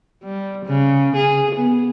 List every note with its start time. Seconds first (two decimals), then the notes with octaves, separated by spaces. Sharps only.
0.24 G3
0.66 C#3
1.16 G#4
1.56 B3